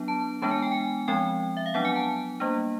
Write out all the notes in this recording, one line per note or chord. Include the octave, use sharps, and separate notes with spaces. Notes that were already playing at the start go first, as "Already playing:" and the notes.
Already playing: F#3 B3 D4
A5
E3 G#3 B3 D4 A5
G#5
G5
G#5
F3 G#3 C4 G5
E5
F5
F#3 B3 D4 F#5
G#5
A5
G3 A#3 D4